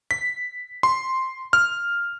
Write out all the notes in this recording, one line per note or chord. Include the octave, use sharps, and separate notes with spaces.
B6
C6
F6